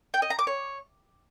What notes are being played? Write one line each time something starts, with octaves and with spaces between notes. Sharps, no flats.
G5
D#5
A#5
D6
C#5